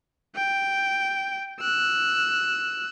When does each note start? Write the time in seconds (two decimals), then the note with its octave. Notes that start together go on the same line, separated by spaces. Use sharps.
0.36 G5
1.60 E6 F#6